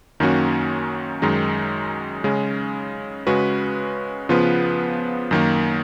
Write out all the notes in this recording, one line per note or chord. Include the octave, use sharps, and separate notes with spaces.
F#2 D#3 A#3 C#4 F#4
F#2 D#3 G#3 D#4
C#3 G#3 C#4
C#3 G#3 C#4 F#4 B4
C#3 F3 B3 F4 B4
F#2 D#3 A#3